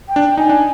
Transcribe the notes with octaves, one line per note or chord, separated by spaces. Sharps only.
G5
D4
D#4 G#5
D4